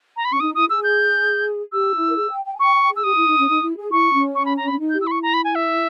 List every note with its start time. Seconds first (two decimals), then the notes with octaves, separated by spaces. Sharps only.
0.17 A#5
0.25 B5
0.31 C#4 C#6
0.40 D#4 D#6
0.55 E4 D#6
0.69 G#4 E6
0.84 G6
1.72 G4 E6
1.94 E4
2.08 A#4
2.16 G#4
2.30 G5
2.45 G5
2.55 G#5
2.59 G5 C#6
2.74 G5
2.89 G#4
2.96 E6
3.03 G4 D#6
3.14 E4
3.25 D#4
3.36 C#4
3.47 D#4
3.62 E4
3.76 G#4
3.91 E4 C#6
4.13 C#4
4.35 C#6
4.46 B5
4.57 A#5
4.68 B5
4.71 C#4
4.79 D#4
4.90 G4 G6
5.01 E4 E6
5.07 B5
5.11 C#6
5.23 A#5
5.34 B5
5.44 G#5
5.55 E5